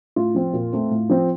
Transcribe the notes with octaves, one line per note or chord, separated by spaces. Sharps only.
A2 F4
F3 C4
A#2
A3 C4
A2
F3 C4